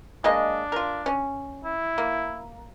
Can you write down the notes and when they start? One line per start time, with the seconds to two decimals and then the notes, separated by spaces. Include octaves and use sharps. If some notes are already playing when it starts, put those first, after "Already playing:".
0.24 G#3 A#3 D4 D#5
0.72 F4 A#4
1.06 C#4
1.65 E4
1.98 A#3